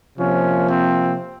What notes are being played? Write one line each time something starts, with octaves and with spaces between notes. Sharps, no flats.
C3 F3 A#3 C#4
C4